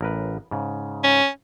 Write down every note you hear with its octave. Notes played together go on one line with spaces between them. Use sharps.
A1 A#4 B4
G#2 C#3
C#4